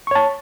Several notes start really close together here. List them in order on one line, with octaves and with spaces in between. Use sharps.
C#6 C#5 A5